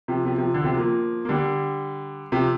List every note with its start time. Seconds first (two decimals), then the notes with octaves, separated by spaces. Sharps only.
0.08 C3 F3
0.25 C3 F3
0.38 C3 F3
0.54 D3
0.64 C3 F3
0.77 F3 A#3
1.25 A#3
1.29 D3 G3
2.32 C3 F3